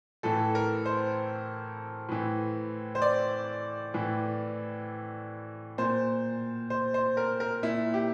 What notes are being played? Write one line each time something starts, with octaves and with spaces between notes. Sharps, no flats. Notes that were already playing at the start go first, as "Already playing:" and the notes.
A2 E3 A4
A#4
C5
A2 E3
C5
D5
A2 E3
A#2 C5
C5
C5
A#4
A#4
A#2 E4
G4